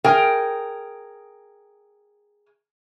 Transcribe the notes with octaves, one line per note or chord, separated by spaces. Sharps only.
G#4 A#4 G5